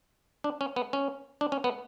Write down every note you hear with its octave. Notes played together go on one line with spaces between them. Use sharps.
D4
C#4
B3
C#4
D4
C#4
B3